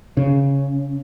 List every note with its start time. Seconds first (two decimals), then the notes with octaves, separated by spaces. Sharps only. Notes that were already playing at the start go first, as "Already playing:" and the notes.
0.17 C#3